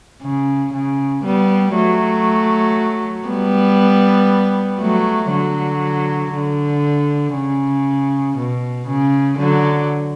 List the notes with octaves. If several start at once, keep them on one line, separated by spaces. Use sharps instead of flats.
C#3
C#3
G3 B3
F#3 A3
G3 B3
F#3 A3
D3 F#3
D3
C#3
B2
C#3
D3 F#3